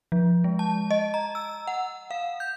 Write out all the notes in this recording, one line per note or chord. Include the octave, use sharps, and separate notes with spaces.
F3
G#3
A5
D#5
A#5
E6
F#5
F5
G6